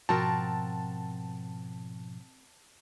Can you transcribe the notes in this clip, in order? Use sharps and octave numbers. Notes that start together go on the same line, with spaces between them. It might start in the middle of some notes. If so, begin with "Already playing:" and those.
G#2 B2 F3 C4 F#4 A#4 A5